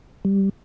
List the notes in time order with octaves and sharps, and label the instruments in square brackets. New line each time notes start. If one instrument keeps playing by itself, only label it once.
[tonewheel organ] G3